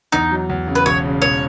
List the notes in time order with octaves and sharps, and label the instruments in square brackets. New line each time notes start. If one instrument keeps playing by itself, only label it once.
[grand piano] E2 [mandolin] D#4
[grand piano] F#3
E2
C#3
[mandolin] B4
[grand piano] E1 [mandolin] C#5
[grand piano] C#3
[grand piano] E1 [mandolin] C#5